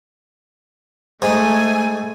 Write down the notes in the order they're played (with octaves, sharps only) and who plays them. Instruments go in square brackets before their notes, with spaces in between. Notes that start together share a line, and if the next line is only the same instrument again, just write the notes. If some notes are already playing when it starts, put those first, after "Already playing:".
[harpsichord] G#2 [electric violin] A3 [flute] G#5